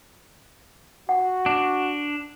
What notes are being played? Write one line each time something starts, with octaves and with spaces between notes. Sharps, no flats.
F#4 F#5
D4